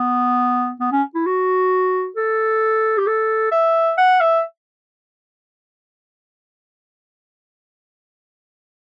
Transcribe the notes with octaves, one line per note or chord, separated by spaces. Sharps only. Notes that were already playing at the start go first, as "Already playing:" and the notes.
Already playing: B3
B3
C#4
E4
F#4
A4
G4
A4
E5
F#5
E5